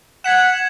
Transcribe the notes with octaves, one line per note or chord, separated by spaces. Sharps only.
F#5 G#6 B6 E7